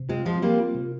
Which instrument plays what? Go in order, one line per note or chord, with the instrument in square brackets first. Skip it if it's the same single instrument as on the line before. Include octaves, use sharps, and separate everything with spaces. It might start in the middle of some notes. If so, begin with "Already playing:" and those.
Already playing: [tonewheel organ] C3
[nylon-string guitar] G#3 C4 [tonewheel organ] F4
[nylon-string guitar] F3 G#3 [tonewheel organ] C4
[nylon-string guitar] G3 A#3 [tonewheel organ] C4
[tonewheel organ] F4
C3